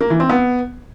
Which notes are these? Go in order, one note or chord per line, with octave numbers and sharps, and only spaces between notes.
A#3
E3
C4
B3